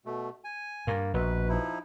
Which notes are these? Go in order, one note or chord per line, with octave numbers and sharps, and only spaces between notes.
B2 A3
G#5
G2 A#3
A#1 B2 B4
F3 D#4 E4